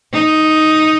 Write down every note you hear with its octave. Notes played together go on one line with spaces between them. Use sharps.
D#4